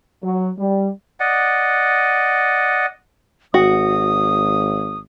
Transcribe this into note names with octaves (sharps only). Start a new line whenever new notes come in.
F#3
G3
D5 D#5 F#5
G#1 F#4 D#6